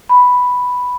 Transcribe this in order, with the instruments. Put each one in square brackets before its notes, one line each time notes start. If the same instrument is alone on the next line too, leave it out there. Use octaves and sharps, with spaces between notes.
[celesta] B5